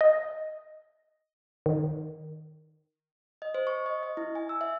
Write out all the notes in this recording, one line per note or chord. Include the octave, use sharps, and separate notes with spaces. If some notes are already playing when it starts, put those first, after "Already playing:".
D#5
D#3
D#5
C5
C#6
D#5
D#5
E4
G#5
E6
E5